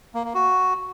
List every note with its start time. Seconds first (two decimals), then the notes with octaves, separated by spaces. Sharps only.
0.14 A#3
0.24 A#3
0.35 F#4